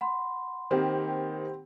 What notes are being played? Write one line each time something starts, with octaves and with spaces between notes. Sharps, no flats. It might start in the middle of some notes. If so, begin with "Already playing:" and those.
F#5 B5 C6
D#3 A#3 C4 G4